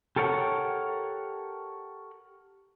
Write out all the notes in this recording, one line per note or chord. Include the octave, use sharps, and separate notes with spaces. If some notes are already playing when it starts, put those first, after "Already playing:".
G4 A4 A#4 C#5 F#5